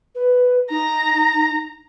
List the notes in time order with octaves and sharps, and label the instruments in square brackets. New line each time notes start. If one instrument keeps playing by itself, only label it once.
[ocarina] B4
[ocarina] D#4 [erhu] A#5